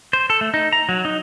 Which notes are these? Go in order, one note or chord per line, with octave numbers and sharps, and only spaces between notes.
C5
A4
A3
D#4
A#5
F#3
D#4